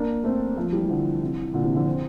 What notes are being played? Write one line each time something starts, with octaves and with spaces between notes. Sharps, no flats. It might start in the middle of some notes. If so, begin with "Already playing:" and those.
Already playing: A#3 D4
A3 C4
F3 A3
E3 G3
G3
D3 F3
C3 E3
A#2 D3
C3 E3
D3 F3
C4